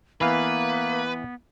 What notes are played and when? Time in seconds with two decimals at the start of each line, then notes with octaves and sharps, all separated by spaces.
0.21 E3 A#3 B3 B4 F5